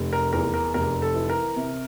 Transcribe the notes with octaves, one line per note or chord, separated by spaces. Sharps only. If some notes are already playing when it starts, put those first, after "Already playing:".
Already playing: F1
A#4
E2 A#4
A#4
F1 A#4
A4
E3
A#4
C3